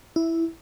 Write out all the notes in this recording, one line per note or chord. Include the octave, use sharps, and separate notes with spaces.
E4